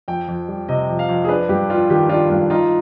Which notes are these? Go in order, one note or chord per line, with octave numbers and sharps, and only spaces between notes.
F2 G5
F2
G3
C3 D#5
F2
F5
F2
G#4
D4 B4
G2 G4
G3 F4
D#3 G4
D4 F4
G2 F4
D#4 F4